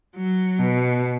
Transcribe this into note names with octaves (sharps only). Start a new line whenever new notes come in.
F#3
B2